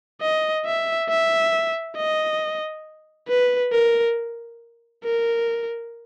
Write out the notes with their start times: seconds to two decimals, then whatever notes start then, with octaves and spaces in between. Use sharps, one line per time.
0.21 D#5
0.65 E5
1.09 E5
1.97 D#5
3.29 B4
3.73 A#4
5.05 A#4